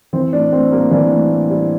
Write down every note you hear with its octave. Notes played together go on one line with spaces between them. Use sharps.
E3 C4
A2 D4
A2 C4
G3 A#3
E3 D4
A2
A2
G3